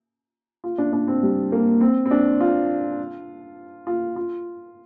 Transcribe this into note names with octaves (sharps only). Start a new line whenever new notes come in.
F4
D4
D4
C4
G3
A#3
C4
C4
D4
F4
F4
F4